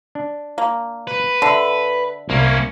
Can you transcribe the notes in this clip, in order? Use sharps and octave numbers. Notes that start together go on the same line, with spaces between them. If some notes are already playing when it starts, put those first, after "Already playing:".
D4
A#3
B4
D3 A4 E5
C2 A#3 C#4